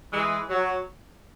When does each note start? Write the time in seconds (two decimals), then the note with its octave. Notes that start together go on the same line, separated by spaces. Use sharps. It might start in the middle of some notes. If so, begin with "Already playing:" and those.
0.13 E3 G#3
0.49 F#3